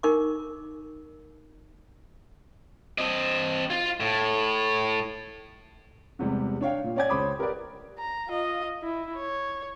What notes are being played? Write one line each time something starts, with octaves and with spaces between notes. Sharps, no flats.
D#4 A#4 C#6 D6
C4 D#5
F4
A2
E2 C3 G3 G#3
D4 C#5 F5 G5
A#2
C#4 C#5 D5 G#5 G#6
C#2 C5 C#5 B5 D6 D#6
G4 A#4 B4 D5
A#5
F4 D#5
E4
C#5